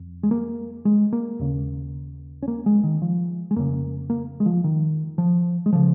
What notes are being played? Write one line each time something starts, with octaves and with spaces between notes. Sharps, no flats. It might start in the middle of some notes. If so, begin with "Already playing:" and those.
Already playing: F2
G#3
A#3
G#3
A#3
D#2 C#3
C#4
A#3
G#3
D#3
F3
G#3
F2 C#3 A#3
A#3
G#3
F3
D#3
F3
G#3
C#3 F3